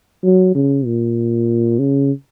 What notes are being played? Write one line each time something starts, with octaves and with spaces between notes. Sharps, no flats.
F#3
C#3
A#2
C#3